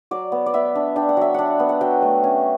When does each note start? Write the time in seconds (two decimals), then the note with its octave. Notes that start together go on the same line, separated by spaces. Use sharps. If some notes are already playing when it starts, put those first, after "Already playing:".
0.11 F#3 D5
0.32 B3
0.46 D5
0.54 B3 E5
0.75 D4
0.96 D4 G5
1.09 F#5
1.17 F#3 E5
1.34 D4 F#5
1.59 B3
1.69 F#5
1.81 F#3 G5
2.02 A3
2.24 C#4